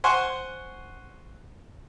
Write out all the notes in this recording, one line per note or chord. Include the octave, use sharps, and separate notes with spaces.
C5 F#5 G#5 C6 C#6